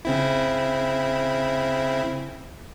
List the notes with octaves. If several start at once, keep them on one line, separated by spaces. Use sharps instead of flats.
C#3 C4 E4